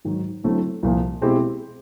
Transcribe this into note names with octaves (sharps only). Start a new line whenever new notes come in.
G#2 D#3 F#3
D3 F#3 A3 C4 E4
C2 A#2 F3
B2 G#3 C4 E4 G4